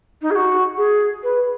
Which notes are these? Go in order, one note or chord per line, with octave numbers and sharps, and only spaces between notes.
D#4
G#4
F#4
G#4
B4